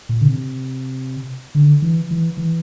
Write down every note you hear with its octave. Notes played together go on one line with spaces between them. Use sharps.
A#2
D3
C3
D3
E3
E3
E3